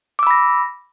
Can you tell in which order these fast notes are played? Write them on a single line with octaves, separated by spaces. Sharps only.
D6 E6 B5 A#6